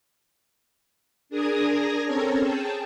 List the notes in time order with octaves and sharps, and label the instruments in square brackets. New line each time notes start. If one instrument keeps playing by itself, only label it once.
[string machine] D4 G#4 A#4 D#6 G#6 A#6
C4 C#4 A4 A#4 C#5 A#5
G#4 G5 A5